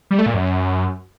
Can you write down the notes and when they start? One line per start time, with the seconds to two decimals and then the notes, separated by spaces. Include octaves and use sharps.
0.11 G3
0.18 A3
0.26 A#2
0.34 F#2